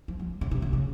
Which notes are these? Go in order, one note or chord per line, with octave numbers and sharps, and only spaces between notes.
F3
G3
C#3
C3
C#3
C#3